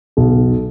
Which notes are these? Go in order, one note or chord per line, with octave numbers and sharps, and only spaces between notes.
B1